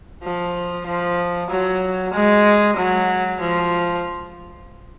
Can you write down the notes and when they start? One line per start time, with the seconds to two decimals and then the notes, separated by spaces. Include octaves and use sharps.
0.23 F3
0.86 F3
1.50 F#3
2.13 G#3
2.77 F#3
3.40 F3